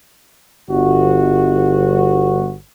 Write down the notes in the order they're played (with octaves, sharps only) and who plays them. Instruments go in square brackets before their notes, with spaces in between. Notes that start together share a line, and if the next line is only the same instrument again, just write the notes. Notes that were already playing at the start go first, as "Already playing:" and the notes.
[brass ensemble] G1 F#4